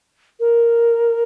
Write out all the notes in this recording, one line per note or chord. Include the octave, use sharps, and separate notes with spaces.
A#4